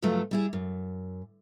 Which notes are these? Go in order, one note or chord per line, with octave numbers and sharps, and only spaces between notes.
G2 C#3 F3 F#3 A3 F4
G3 E4 G#4
F#2